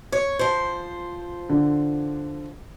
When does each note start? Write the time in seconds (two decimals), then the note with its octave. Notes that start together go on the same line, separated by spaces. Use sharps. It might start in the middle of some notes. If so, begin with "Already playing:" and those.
0.12 C#5
0.39 F3 C5
1.49 D3